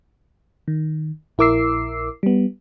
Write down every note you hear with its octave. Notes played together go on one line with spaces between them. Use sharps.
D#3
A#1 E4 A#4 D6 E6 C7
G3 B3